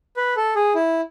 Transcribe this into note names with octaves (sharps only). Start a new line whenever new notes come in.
B4
A4
G#4
E4